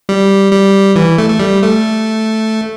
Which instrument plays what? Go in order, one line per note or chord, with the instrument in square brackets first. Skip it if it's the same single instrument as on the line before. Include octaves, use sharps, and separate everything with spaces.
[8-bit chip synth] G3
G3
E3
A3
A3
G3
A3